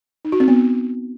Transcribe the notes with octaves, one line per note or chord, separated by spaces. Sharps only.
D#4
F#4
C4
B3